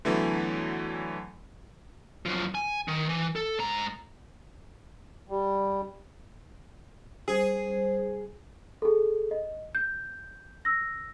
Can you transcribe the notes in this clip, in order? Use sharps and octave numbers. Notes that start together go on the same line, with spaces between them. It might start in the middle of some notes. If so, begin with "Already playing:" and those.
D3 E3 F#3 A3 B3
F#2 F3
G#5
D#3
E3
A4
G#2 A#5
G3
G3 C#4 G#4 C5
G#4 A4
D#5
G6
E6 A#6